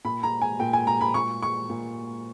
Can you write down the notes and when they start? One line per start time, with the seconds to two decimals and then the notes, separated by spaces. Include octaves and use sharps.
0.05 A#2 B5
0.23 A#5
0.42 G#5
0.60 A#2 G5
0.73 G#5
0.87 A#5
1.01 B5
1.14 A#2 C#6
1.42 C#6
1.70 A#2